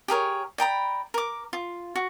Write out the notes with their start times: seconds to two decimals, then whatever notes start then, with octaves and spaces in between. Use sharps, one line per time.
0.08 G4 G#4 A#4 C#5
0.58 D5 G5 A#5 B5
1.14 A#4 D6
1.53 F4
1.95 F#4